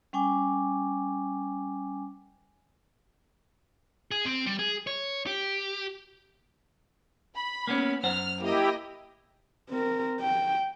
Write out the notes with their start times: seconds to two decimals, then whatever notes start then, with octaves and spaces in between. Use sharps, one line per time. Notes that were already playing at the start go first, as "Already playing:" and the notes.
0.13 G3 C#4 G5 G#5 D6
4.11 G#4
4.25 C4
4.46 G3
4.59 G#4
4.87 C#5
5.27 G4
7.36 B5
7.67 A#3 B3 C#4
8.04 F#2 C5 F#5 F6
8.41 A#3 E4 G4 D#5
9.69 C4 A#4
10.21 G5